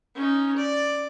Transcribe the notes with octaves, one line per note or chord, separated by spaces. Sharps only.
C#4 D#4
D5